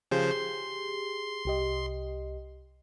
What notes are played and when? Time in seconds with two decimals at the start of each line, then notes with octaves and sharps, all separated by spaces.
0.11 C#3 F3 G4 G#4 C5
0.31 C6
1.45 C2 G4 D#5